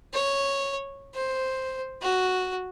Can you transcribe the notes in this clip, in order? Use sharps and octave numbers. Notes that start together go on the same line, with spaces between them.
C#5
C5
F#4